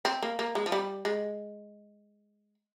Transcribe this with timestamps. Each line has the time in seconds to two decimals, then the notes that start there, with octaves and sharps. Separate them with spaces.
0.05 C4
0.22 A#3
0.39 A#3
0.55 G#3
0.66 F3
0.72 G3
1.05 G#3